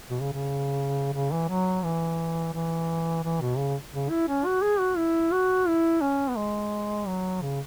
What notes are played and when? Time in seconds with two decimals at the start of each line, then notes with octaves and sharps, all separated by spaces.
0.10 B2
0.21 C#3
0.33 C#3
1.14 C#3
1.32 E3
1.49 F#3
1.84 E3
2.53 E3
3.24 E3
3.41 B2
3.57 C#3
3.93 C#3
4.10 E4
4.28 C#4
4.46 F#4
4.62 G#4
4.79 F#4
4.97 E4
5.31 F#4
5.68 E4
6.01 C#4
6.29 B3
6.37 G#3
7.07 F#3
7.42 C#3